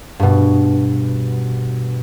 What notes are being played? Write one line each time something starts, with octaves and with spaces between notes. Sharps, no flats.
G2 B2